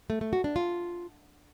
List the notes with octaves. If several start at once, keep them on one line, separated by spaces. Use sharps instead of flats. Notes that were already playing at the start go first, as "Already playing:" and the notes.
A3
A3
F#4
D4
F4